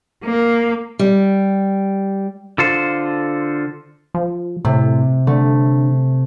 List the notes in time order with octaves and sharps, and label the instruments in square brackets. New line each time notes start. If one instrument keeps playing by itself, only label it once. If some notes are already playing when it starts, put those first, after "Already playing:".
[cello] A#3
[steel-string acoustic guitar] G3
[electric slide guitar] D3 F4 A4 C5
[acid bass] F3
[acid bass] A2 [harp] C3
[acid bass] D3 [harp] A3